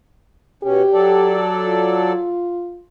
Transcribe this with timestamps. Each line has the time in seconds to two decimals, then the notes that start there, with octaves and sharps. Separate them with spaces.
0.63 B2 C#4 G4
0.93 F#3 A4 D5
1.67 F4